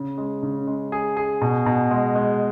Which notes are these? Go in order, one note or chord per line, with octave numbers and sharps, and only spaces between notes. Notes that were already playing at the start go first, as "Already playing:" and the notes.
Already playing: C#3
G#3
C#3
G#3
G#4
G#4
B2
B2
G#3
G#3